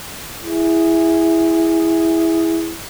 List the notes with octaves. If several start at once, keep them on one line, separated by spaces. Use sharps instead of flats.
E4 G#4